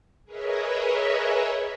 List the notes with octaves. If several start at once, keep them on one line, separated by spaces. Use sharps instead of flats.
G#4 A#4 B4 C#5 D#5 E5